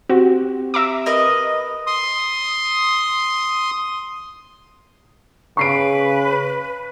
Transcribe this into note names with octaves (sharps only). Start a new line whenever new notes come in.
C4 F#4 G4
E5 A#5 D6
A#4 B4 D#5
C6 D#6
C#3 B4 C#6 C7 D7